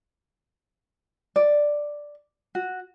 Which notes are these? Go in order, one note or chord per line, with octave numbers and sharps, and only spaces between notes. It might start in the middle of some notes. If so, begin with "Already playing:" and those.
D5
F#4